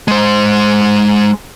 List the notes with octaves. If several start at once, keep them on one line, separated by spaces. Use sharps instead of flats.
G#3 C5